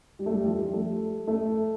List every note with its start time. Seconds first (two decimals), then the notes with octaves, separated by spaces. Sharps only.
0.19 G3
0.26 A3
0.33 G3
0.46 F3
0.59 G3
0.73 A3
1.27 A3